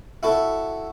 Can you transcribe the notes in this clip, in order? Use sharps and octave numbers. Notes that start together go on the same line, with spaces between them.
E4 F#4 A4